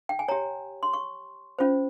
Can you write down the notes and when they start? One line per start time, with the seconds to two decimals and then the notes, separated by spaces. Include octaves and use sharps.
0.09 G5
0.19 G#5
0.28 G4 C#5 A#5
0.83 C6
0.93 C#6
1.59 C#4 F4 C5